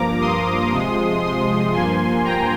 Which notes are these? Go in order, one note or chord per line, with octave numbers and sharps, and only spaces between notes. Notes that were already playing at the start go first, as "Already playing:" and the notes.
Already playing: G2 F3 A#3 A#5 D6
C6 D#6
C3 F3 G#3
C6 D#6
G2 F3 A#3 G#5 C6
G5 A#5